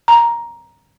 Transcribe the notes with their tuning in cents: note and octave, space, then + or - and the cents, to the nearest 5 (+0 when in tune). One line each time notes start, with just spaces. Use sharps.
A#5 +10